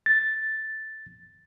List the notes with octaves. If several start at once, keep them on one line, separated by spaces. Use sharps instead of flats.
A6